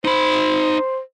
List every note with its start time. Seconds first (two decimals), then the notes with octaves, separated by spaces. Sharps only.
0.05 D#4 C5 B5